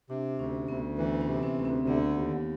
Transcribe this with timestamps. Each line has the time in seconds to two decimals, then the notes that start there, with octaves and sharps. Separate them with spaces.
0.10 C3 D4
0.39 D2 C#4
0.68 D2 B3
0.98 E3 B3
1.21 C#4
1.28 C3
1.43 C4
1.58 D2
1.65 C4
1.87 D3 B3
2.17 D#2